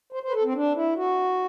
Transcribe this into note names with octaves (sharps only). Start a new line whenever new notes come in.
C5
C5
B4
A4
C4
D4
E4
F#4